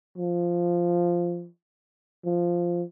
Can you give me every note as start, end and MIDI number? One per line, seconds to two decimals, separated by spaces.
0.18 1.48 53
2.25 2.83 53